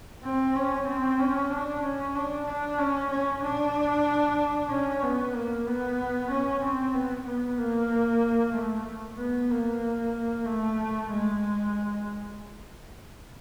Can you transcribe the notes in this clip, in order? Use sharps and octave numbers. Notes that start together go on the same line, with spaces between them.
C4
C#4
C4
C#4
D4
C#4
D4
D4
C#4
C#4
D4
C#4
B3
A#3
B3
C#4
C4
B3
B3
A#3
A3
B3
A#3
A3
G#3